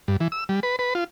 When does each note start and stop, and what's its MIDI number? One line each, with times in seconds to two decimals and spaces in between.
0.08 0.16 43
0.20 0.28 52
0.32 0.44 88
0.49 0.60 55
0.63 0.76 71
0.79 0.94 71
0.95 1.04 65